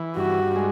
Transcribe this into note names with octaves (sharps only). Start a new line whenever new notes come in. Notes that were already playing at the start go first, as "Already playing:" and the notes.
Already playing: E3
G2 F#4
G#3